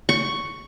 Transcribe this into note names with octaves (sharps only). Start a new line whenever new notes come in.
C#6